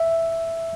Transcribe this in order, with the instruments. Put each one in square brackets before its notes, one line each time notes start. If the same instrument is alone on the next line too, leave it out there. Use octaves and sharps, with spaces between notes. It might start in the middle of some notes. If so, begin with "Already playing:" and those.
Already playing: [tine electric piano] E5